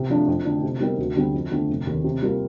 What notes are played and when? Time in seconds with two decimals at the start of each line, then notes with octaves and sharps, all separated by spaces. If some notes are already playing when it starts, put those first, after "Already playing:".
Already playing: C3
0.10 F3 A3 D4
0.27 F2
0.45 D3 A3 D4
0.63 C3
0.80 G3 C4 D#4 A#4
0.98 D2
1.16 D3 G3 C4
1.34 F2
1.51 D3 A3 C4
1.69 F1
1.87 D#2 D#3
2.04 C3
2.22 G3 A#3 F4